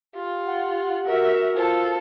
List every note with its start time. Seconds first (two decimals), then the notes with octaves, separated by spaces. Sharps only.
0.15 F4 G4
0.47 F#5
1.06 F#4 A#4 E5
1.56 F4 A4 C5